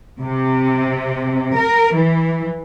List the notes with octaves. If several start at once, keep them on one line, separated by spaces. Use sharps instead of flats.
C3
A#4
E3